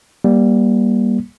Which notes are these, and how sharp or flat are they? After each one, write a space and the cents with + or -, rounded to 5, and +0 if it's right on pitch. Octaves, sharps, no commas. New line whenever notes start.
G3 +0 A#3 +25